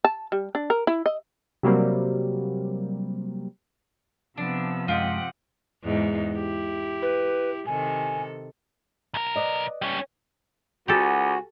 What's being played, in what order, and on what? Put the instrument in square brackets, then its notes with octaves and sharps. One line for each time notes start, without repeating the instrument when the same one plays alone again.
[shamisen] A5
G3
D4
A#4
E4
D#5
[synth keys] C3 F#3 G3 A#3 C4
[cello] C3 F3 [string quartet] B3 E6 [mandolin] D4
[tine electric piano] F#2 G#3 [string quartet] C4 F#5 [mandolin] F4 G4 D#5
[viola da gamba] E2 G#2 D#4
E4 G4
[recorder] B4
[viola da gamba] C3 D#3 A4 [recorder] G#5
[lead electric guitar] B1 A#4
[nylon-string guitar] B4 D5 D#5
[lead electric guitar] G3 C#4
[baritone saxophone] C#2 [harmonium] F#4 [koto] G4 A4 [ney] G#5